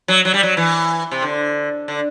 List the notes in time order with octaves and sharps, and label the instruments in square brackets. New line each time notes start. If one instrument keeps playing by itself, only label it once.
[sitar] F#3
F#3
G3
F#3
E3
C3
D3
D3